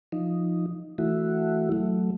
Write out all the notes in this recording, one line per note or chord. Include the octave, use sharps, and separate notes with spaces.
F3 D#4
E3 A3 E4 F#4
F#3 A3